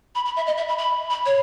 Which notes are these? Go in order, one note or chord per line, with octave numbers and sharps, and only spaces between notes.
B5
B5
E5
D#5
E5
B5
B5
B5
C#5